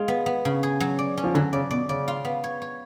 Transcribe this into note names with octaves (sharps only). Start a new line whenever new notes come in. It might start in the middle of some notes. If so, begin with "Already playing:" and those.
Already playing: G#3 F4
B3
B3
C#3
G#4
F#3
D5
C#4
F3
D3 F#3
C#3 D5
B2 D5
C#3 D5
F4
B3
C#5
C#5